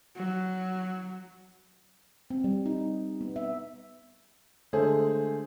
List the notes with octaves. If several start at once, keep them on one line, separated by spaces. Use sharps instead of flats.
F#3
C4
G3
D#4
B3
E5
D3 G#3 A3 G#4 C5